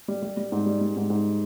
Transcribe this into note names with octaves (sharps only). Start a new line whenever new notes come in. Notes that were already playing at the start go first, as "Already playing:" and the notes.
G3
G3
G3
G#2
G3
G3
G#2
G#2